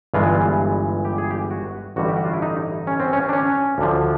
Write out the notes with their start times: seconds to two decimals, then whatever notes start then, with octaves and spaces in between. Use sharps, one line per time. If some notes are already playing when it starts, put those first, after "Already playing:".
0.14 G1 G2 E3 G#3 F4
1.05 G4
1.18 G#4
1.31 G4
1.51 F#4
1.96 A1 G2 D3 G3 F#4
2.08 G4
2.16 F#4
2.25 F4
2.33 E4
2.42 D#4
2.87 C#4
3.00 C4
3.13 C#4
3.29 D4
3.33 C#4
3.78 D2 D3 F3